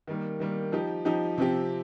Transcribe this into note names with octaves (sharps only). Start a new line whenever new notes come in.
D#3 G3 A#3
D#3 G3 A#3
F3 D#4 G4
F3 D#4 G4
C3 F3 C4 G4